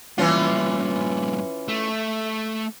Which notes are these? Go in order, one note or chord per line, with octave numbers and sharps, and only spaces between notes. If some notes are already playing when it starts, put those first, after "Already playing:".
G2 A#2 E3 C#4 F4
A3